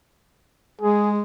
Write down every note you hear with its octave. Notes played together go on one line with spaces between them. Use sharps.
G#3 G#4